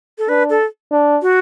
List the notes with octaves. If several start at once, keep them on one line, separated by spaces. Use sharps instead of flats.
A4
D4 B4
A4
D4
F#4